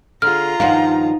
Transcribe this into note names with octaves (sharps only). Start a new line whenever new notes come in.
D3 F4 G#4 A#5 F6
G2 D#3 F3 D#4 F5 F#5